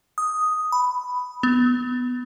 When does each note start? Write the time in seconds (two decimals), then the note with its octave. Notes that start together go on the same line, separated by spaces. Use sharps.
0.18 D#6
0.72 B5
1.43 B3